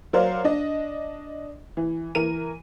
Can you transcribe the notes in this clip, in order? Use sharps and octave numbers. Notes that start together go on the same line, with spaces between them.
F#3 A#4 C5 D5 F5
D4 D#5
E3
E3 A#4 D#7